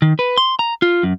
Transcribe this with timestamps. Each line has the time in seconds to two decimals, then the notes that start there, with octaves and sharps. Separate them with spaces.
0.02 D#3
0.19 B4
0.38 C6
0.59 A#5
0.82 F4
1.03 F#2